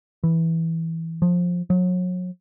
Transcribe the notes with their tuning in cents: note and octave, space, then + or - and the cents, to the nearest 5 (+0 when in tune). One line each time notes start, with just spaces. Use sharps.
E3 -10
F3 +15
F#3 -35